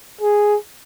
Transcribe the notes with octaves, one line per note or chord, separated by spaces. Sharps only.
G#4